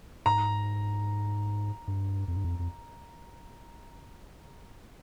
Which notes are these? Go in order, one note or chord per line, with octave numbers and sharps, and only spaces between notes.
G#2 A#5
G2
F2
G2
F2
F2